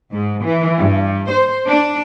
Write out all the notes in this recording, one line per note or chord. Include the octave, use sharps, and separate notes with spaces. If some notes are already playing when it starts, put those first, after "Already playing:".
G#2
E3
G2
C5
D4